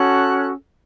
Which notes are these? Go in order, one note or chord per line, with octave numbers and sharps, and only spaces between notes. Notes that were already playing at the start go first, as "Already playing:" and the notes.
Already playing: C#4 F#4 A4 F#6